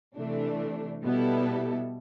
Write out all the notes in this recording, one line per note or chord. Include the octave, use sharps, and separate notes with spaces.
C3 E3 A3 D4
B2 G3 B3 E4 A4